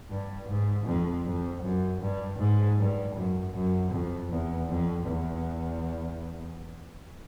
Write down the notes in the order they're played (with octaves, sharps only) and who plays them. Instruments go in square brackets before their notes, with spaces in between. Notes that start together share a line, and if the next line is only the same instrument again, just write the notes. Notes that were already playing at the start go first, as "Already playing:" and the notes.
[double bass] G2
G#2
F2
F2
F#2
G2
G#2
G2
F#2
F#2
F2
E2
F2
E2